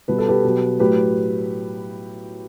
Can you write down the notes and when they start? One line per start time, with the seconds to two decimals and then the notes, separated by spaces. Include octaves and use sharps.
0.08 B2 G3 B4
0.18 A4
0.28 G4 B4
0.44 B2 F#3
0.79 A2 F#3 G4 B4